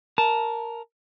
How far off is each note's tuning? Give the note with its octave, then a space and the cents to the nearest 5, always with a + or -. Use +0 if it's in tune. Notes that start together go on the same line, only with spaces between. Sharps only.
A#4 +0 A5 -10